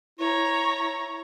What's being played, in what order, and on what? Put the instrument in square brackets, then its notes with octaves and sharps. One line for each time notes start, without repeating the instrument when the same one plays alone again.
[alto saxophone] E4 [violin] C#5 A#5